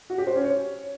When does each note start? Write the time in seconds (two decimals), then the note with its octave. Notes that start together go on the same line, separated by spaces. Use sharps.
0.10 F#4
0.18 G4
0.27 C5
0.36 C#4
0.44 C#5